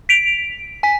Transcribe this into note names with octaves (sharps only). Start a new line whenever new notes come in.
B6 D7 F7
G#5 B6